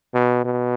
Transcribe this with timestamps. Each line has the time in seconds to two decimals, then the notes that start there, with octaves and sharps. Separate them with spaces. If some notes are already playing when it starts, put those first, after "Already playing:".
0.14 B2
0.45 B2